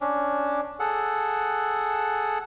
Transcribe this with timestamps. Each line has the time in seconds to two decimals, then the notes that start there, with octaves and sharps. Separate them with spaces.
0.01 C#4 D4
0.80 G#4 A4 F#5